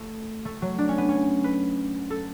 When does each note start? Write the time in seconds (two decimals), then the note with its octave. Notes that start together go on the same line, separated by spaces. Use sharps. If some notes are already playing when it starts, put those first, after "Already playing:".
Already playing: A3
0.45 A3
0.62 F#3
0.78 D4
0.89 C#4
0.98 B3
1.09 C#4
1.44 B4
2.10 A4